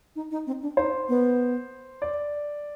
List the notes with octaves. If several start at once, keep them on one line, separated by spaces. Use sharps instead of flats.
D#4
D#4
C4
D4
D#4 C5
B3
D5